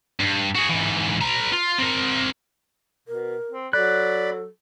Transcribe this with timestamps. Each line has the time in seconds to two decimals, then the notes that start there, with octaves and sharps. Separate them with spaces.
0.20 G2
0.55 F#4 G#4
0.70 G#2 E3
1.22 B4 A#5
1.52 F4
1.78 C4 A#4
3.08 B2 A#4
3.51 C4
3.73 F#3 A4 D5 B5 F#6